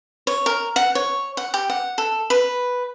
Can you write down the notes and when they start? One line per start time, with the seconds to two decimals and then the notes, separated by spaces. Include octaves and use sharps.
0.27 C#5
0.46 A#4
0.76 F#5
0.95 C#5
1.37 F#5
1.54 G4
1.70 F#5
1.98 A4
2.30 B4